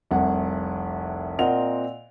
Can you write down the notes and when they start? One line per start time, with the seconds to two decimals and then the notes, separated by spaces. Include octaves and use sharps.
0.11 F1 C2 F#5
1.38 A#2 C4 A#4 D#5 F#5 F7